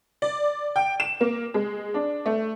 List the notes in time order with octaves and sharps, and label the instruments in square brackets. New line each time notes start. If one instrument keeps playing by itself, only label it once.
[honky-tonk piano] D5
G5
E7
A#3
G#3
D4
A3